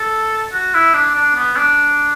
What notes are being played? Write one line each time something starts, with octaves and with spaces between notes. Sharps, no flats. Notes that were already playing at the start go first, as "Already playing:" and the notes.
Already playing: A4
F#4
E4
D4
D4
B3
D4